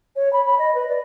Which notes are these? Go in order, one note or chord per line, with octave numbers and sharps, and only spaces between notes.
C#5
B5
B5
D#5
B4
D5